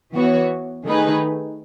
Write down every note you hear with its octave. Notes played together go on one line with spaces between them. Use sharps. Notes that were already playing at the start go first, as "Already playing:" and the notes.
E3 B3 F#4 C#5
D#3 A3 D#4 G#4 B4